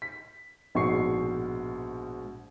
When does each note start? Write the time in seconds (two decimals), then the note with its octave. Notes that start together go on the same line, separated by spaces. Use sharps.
0.02 B6
0.75 A#1 G#2 B2 C#6 C7